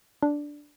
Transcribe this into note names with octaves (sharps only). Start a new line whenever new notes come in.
D4